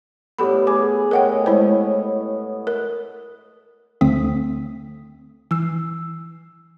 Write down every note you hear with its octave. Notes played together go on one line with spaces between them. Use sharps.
A2 G3 B3 G4 A4 B5
G#4 D6
A2 A#4 C#5 D#5 F#5 G5
G#3 E4 C5
A#4
D2 D3 A3 C4 D#6 B6
E3 E6 C7